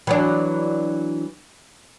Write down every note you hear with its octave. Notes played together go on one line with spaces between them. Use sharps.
E3 F#3 D4